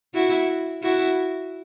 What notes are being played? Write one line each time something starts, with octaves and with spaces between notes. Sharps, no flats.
E4 F#4
E4 F#4